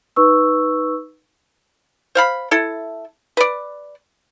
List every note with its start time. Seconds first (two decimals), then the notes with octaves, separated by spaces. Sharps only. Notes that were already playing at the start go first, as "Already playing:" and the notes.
0.16 D#4 B4 C#6 E6
2.15 C5 F5 B5
2.51 E4 A4
3.37 B4 D5